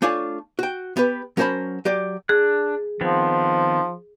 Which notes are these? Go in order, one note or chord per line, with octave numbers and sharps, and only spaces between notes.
A3 D4 F4 C#5 G#5
F#4 G5
B3 G4 B4
F#3 C#4 A#4 C5 A5 B5
F#3 G4 D5
D4 G#4 F#6
D#3 F3 B3 C4